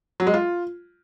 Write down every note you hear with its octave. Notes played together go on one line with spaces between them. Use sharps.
F#3
G#3
F4